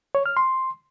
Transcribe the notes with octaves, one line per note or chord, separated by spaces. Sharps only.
C#5
F6
C6